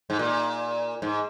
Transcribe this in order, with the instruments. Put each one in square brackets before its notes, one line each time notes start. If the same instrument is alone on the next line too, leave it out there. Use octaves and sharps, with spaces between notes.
[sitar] G#2
A#2
G#2